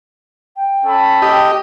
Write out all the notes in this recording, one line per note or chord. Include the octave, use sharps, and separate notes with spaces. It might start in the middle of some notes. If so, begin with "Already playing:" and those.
G5
C#4 A4 B5
G4 D#5